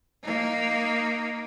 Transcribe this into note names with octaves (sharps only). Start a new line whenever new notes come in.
A#3 D#4